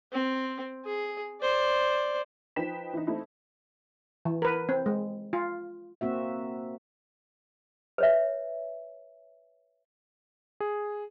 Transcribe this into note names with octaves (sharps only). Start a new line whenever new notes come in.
C4
G#4
C5 D5
F3 D#4 B4 G5 B6 E7
E3 D#4
A3 C4 D#4 E4
E3
A#4 B4
C4
G#3
F4
A#3 C4 F#4 E5
B4 C#5 E5
G#4